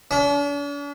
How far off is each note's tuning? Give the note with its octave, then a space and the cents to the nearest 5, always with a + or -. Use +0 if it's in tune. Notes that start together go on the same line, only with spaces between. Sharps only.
D4 -45